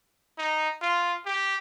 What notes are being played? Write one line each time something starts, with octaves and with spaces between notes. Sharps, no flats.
D#4
F4
G4